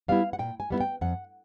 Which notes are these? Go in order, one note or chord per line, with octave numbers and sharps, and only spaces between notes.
G3 B3 E4 F5
F#5
A#2 G5
G#5
G3 B3 E4
G5
F2 F#5